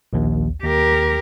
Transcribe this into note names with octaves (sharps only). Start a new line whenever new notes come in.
A#1 D#2
D#2 G4 A#4